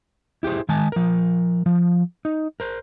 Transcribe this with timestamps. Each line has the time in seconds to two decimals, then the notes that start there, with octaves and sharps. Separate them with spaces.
0.43 E4 G4 G#4 C5
0.69 D#3 G#3 G#5 A5
0.92 F3 A#4
1.66 F3
2.25 D#4
2.60 A#4 C5